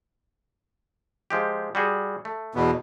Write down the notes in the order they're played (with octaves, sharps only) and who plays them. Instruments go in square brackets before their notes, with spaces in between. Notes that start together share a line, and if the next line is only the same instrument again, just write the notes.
[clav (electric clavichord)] F3 G#3 G4
G3 F#4 G#4
A3
[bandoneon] E2 B2 B3